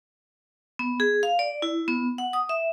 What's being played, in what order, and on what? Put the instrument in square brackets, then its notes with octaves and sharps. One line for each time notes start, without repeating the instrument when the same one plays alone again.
[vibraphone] B3
G#4
F5
D5
E4
B3
F#5
D#6
E5